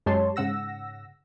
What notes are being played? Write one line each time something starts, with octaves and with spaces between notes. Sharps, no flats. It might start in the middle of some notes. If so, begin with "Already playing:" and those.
F#2 G#3 G4 C#5 A5 C6
G#2 C#3 F#5 E6 A#6